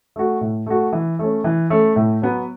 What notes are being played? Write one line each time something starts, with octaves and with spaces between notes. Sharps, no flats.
A3 F#4
A2
A3 F#4
E3
A3 C#4
E3
A3 C#4
A2
F#3 B3